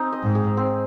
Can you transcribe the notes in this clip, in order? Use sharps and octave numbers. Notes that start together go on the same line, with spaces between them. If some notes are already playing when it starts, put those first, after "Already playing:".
Already playing: C4 D#4 G#4
D#5
G#2
G#4
C4